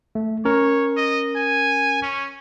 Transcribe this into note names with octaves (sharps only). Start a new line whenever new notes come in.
A3
C#4 A#4 C#5
D#5
G#5
C#4